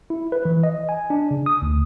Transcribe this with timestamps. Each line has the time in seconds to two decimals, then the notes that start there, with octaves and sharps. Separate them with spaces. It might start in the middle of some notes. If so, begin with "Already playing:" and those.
0.10 E4
0.32 B4
0.45 E3
0.63 D#5
0.89 G#5
1.10 D4
1.31 C#3
1.46 D#6
1.62 D2